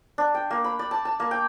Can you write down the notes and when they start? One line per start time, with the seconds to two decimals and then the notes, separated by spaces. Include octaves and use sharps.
0.18 D4
0.35 G5
0.50 A#3
0.64 B5
0.79 D5
0.91 A5
1.05 A5
1.20 A#3
1.31 G5